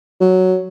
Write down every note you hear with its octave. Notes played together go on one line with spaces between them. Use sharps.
F#3